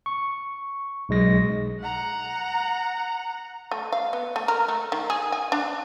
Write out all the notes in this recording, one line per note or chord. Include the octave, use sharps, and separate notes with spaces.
C#6
B1 G#3 A#6
F#5 A#5
A3
F5
B3
A3
A#4
A3
D#3
G#4
G#5
D4